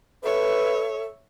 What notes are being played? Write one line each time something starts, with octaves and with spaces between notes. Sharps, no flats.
A4 B4 C#5 E5